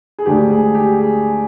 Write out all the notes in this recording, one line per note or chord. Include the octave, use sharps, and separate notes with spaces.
G#4
D2 D3 G#3 D4 G4
G#4
G4
G#4